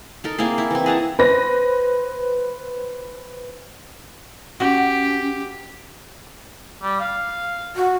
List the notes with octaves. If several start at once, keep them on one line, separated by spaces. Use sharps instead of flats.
D#4 A4 A#4
A#3 C4 E4 G#4
E4
E3 C4
G#4 F#5 A5 A#5
B4 C5 A#6
C#4 F#4 G4
G3
F5
F#4